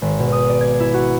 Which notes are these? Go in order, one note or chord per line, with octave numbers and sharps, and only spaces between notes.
G#1
B2
D#6
D5
G#6
E4
F#4